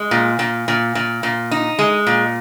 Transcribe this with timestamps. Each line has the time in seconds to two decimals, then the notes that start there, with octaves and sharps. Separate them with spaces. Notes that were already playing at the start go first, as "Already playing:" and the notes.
Already playing: G#3
0.11 A#2
0.39 A#2
0.68 A#2
0.95 A#2
1.23 A#2
1.51 D#4
1.79 G#3
2.07 A#2